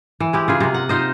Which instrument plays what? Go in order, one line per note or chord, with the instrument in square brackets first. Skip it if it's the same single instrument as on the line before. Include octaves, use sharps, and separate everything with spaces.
[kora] E3
G#3 E4 G4
C#3 F4 G#4
C3 A#3
F#5
D#4 F4 C5 D#5